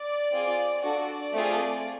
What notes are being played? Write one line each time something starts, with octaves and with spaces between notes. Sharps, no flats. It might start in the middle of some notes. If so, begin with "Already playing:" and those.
Already playing: D5
C4 F4 G#4
D4 F#4 A4 D5
A3 C4 F4 G#4